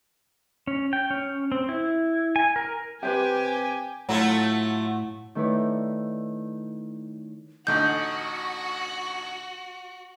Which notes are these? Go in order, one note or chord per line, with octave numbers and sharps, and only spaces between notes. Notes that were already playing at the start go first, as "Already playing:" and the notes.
C#4
G5
C#4
C4
E4
G#5
A#4
C3 G4 B4 C5 G5 G#5
A2 F#3 A3 F4
D#3 A3 E4 B4 C#5 D5
A1 D3 D#4 F#4 C#6 G6